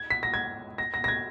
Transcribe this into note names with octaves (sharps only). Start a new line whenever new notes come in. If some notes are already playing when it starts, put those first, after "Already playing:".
Already playing: G#6
B6
A#6
G#6
A#6
A#6
A#6
G#6